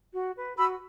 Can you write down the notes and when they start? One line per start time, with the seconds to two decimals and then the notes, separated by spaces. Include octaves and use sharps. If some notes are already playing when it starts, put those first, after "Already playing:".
0.14 F#4
0.36 B4
0.57 F#4 B5 E6